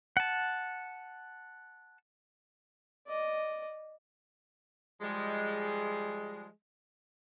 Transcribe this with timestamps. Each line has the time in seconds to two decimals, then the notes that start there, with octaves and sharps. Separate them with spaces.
0.17 F#5 A5
3.07 D5 D#5
5.01 F3 G3 G#3